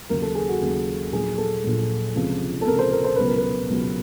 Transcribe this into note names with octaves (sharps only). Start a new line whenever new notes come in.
D#2 C#3 F#3 A#4
A4
G#4
F#4
D#2 C#3 F#3
A#1 A#2 F#3 G#4
A4
A#1 A#2 F#3
C#2 C3 F3
A4
C#2 C3 F3 A#4
C5
A#4
C5
C#2 B2 F#3 B4
A#4
B4
C#2 B2 F#3